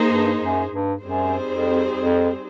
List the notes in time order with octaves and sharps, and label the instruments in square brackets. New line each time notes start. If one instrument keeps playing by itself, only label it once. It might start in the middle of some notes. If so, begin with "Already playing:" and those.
Already playing: [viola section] A#3 D#4 G#4 C5
[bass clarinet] G2
F#2
G2
[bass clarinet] F#2 [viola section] G3 C4 D#4 G#4 C5
[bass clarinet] F2
F2